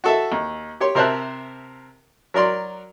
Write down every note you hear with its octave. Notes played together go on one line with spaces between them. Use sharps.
F#4 A4 E5
D#2
G4 C#5 C6
C3 A#4 C5 E5 A5 F#6
F#3 A#4 D5 C6